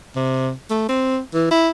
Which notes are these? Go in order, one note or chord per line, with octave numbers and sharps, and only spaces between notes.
C3
A3
C4
E3
E4